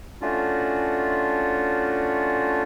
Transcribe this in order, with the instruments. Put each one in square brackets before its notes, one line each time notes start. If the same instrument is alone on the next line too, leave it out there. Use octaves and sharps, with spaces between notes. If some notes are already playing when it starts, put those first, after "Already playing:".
[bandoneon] A3 C#4 D4 F4 F#4